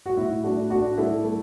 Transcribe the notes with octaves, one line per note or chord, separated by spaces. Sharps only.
F#4
A2 E4
A3 D4 F#4
A2 D4 F#4
A3 E4 A4
A3